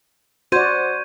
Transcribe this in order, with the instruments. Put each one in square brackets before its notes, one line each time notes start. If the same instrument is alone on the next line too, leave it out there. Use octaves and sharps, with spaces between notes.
[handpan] F#4 D5 [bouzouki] C5 [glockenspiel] G6 G#6 D#7